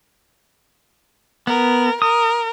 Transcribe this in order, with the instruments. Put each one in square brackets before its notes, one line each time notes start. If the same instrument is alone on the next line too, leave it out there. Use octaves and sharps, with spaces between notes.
[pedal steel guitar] B3 [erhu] A#4
[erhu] A#4 [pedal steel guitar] D#6